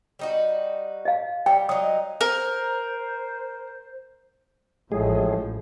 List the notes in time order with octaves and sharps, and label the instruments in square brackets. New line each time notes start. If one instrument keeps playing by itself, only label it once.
[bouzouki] G3 D#4 F#4
[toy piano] D#5 F5
[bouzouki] G3 [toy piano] G5
[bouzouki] F#3 D#4 [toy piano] D#6
[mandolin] A#4 [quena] C5
[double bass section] A1 F3 [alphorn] A2 [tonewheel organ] G#3 G#4